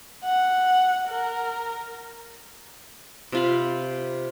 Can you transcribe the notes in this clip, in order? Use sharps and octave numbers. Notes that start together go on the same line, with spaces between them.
F#5
A#4
C3 F4 B5